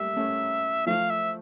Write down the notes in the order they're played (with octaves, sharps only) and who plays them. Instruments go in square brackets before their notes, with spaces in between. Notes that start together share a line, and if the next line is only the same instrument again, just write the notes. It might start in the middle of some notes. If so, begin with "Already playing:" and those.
Already playing: [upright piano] G3 A3 A#3 [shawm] E5
[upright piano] A3 C#4
[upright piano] F3 A3 [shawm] F5
[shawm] E5